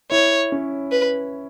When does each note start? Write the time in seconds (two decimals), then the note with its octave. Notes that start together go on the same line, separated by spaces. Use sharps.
0.11 E4 C#5
0.52 C#4
0.91 B4